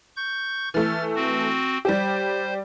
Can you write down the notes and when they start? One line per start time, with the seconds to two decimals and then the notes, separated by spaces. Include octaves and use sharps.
0.16 C#6 G6
0.74 E3 A3 F6 A6
1.15 C4 F#4
1.85 G3 G4 C5